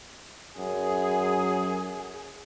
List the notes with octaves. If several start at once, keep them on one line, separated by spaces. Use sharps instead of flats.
F#2 G#4